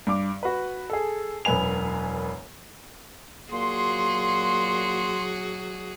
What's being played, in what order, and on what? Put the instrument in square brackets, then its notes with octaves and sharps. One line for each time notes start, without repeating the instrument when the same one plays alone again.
[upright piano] G2 D6
F#4 B4
G#4 A4
E1 F#2 B4 G#5 F7
[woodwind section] A#2 A#3 C6 [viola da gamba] F#3 F#4 G#4